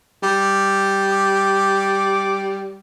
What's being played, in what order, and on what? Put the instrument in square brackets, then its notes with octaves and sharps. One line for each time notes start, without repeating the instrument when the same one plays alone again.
[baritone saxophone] G3
[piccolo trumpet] D6